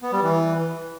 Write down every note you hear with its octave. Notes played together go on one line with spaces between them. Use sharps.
B3
G3
E3